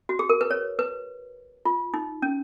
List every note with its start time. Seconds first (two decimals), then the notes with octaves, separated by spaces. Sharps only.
0.09 F#4
0.19 G#4
0.29 A#4
0.41 B4
0.51 C#5
0.79 B4
1.65 F4
1.94 D#4
2.22 C#4